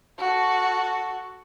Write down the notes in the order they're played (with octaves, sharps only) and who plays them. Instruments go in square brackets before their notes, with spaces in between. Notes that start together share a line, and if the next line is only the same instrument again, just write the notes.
[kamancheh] F#4 A4